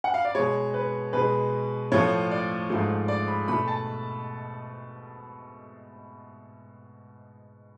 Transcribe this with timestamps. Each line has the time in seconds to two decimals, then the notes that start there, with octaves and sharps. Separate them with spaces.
0.04 F#5
0.14 F5
0.25 D5
0.35 B2 G#3 C#5
0.74 B4
1.13 B2 G#3 B4
1.92 A2 F3 A3 C#5
2.31 D5
2.70 G#2 F3 A3
3.08 D5
3.28 B5
3.48 B2 A3 B5
3.68 A5